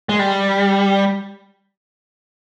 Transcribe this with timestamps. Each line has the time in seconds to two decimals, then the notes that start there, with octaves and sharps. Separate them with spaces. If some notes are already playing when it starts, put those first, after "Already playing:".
0.09 G#3
0.19 G3